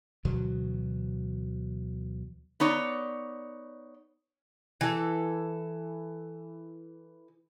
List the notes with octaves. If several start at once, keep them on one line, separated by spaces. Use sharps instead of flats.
D2 B2 E3 F#3
B3 D#4 C#5 D5
E3 A4